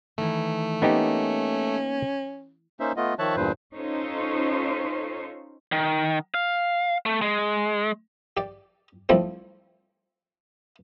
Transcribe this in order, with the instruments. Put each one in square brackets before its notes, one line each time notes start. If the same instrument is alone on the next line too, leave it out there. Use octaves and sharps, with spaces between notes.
[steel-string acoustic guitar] D#3 E3 [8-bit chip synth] A3
[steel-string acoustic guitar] A#3 [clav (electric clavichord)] B3 D#4 G4 [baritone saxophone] C#4
[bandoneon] A#3 C#4 D#4 C5 E5
A3 B3 F4 D#5
D#3 F3 C#5 E5 A5 F#6
E2 G2 A#2 B4 C5
[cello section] C#4 D#4 F4 A4 C5 C#5
[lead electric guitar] D#3
F5
A3
G#3
[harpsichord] G4 D5
C2 F3 G3 A3 C4